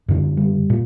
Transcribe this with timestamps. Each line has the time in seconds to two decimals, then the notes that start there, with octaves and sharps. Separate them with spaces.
0.08 F#2 D3
0.37 G3
0.70 A#2